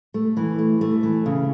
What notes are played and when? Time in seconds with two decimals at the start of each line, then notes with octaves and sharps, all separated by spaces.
0.14 A3
0.37 E3
0.59 A3
0.81 A3
1.03 E3
1.26 C#3